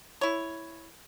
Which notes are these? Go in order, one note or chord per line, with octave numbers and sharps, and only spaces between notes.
E4 C#5